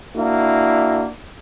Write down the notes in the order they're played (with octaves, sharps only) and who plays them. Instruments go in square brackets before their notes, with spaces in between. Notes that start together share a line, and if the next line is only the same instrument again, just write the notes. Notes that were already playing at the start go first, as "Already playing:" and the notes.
[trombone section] A#3 D4 E4 F#4